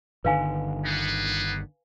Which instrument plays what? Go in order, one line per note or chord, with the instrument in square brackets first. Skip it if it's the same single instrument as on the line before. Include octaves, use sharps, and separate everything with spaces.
[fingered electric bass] G1 D3 D#3 [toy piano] B4 F5 G#5
[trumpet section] A#3 B3